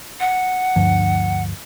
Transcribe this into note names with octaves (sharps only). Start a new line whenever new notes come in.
F#5
D2 G2 F3